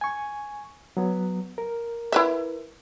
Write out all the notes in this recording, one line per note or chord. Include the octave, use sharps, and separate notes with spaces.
G#5 C#6
F#3 B3
A#4
E4 B4 E5